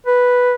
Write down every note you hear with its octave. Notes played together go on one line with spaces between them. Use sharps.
B4